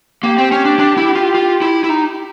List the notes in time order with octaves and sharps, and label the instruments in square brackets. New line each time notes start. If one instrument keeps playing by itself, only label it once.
[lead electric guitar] A#3 [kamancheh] G4
[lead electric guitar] C4
C#4
D4
D4
E4
F4
F4
E4
E4
D#4